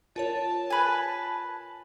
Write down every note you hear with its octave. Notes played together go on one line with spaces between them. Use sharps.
F4 A#4 C#5 A5
B4 G#5